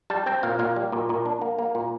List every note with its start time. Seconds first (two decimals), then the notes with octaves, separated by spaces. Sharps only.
0.10 G3 A5
0.26 C4 G5
0.43 A#2 F5
0.59 A#2 F5
0.76 G3
0.92 A#2
1.09 A#2
1.26 D4
1.42 A#3
1.59 A#3
1.75 A#2